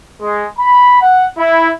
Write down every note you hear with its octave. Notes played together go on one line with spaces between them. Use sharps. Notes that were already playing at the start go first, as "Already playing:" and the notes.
G#3
B5
F#5
E4